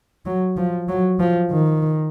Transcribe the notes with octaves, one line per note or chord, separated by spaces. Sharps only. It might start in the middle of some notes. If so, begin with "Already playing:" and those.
F#3
F3
F#3
F3
D#3